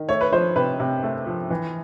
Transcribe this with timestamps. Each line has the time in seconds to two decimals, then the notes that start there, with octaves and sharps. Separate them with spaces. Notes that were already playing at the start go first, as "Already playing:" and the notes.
Already playing: D#3
0.09 A3 C#5
0.21 B4
0.32 F3 C5
0.56 C3 B4
0.80 C3
1.03 A3
1.26 F3
1.50 E3